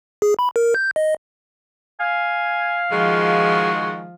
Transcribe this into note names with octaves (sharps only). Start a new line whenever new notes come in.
G#4
B5
A#4
G6
D#5
F5 G#5
D#3 F3 G#3 F4 F#4